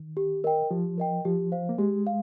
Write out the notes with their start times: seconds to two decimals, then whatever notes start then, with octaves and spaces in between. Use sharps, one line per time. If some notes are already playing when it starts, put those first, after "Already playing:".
Already playing: D#3
0.17 G4
0.44 A#4 D#5 G5
0.71 F3 G4
0.98 A#4 D#5 G5
1.25 F3 G4
1.52 C5 F5
1.69 A#3
1.78 G#3 G4
2.07 F5